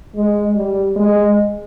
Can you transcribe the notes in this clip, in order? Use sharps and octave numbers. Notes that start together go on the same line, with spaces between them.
G#3
G3
G#3